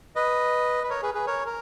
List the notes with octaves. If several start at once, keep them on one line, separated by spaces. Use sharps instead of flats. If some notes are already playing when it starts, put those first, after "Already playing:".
B4 D#5
B4
A#4 C#5
G#4 B4
G#4 B4
A#4 C#5
A#4